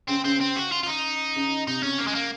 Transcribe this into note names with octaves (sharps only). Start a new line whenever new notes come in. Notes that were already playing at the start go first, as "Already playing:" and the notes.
C#3 C4
C#3 C4
C4
F#4
F4
F4
D#4
C#3
C3 D#4
C#3 C#4
C#3 A#3
G#3
A#3